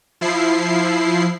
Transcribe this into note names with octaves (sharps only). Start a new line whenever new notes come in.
F3 E4 C7